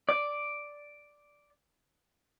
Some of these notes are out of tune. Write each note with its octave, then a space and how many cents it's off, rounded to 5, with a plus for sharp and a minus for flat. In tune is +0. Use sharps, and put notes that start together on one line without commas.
D5 +0